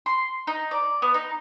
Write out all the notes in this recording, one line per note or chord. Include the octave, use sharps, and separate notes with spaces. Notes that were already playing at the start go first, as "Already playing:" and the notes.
C6
D#4
D5
B3
D#4